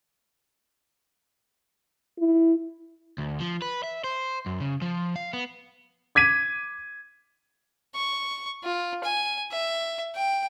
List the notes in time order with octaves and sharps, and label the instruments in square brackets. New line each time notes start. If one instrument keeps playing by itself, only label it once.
[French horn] E4
[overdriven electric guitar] D2
F3
B4
E5
C5
F#2
C#3
F3
F5
B3
[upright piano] D6 G#6 B6 D#7
[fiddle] C#6
F4
G#5
E5
G5